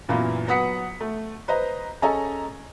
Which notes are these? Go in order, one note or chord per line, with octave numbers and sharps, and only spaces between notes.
F#2 A#2 E3 A#3 B3 F4
F#3 B3 F#5 D#6 B6 C#7
A3
B4 C5 D#5 A#5
C#4 G#4 A4 D#5 G#5 A#5